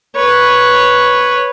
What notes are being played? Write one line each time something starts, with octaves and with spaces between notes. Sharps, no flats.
B4 C#5